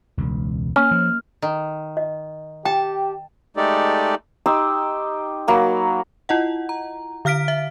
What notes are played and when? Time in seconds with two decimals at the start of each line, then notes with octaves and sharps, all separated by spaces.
0.17 E1 C#2
0.76 A#3 C#4 F6
0.91 F3
1.42 D#3
1.97 D#5
2.65 G4 G5 A5
3.57 G#3 A3 D#4 G4 A4 D5
4.46 D#4 G4 C6 E6
5.48 F#3 A#3 B5
6.29 E4 F4 D#5 F#5
6.69 A#5
7.25 D3 F5 F6 B6 D7
7.48 E5